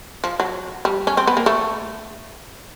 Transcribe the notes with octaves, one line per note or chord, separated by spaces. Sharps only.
F3
F#3
G3
C#4
C4
B3
A#3
A3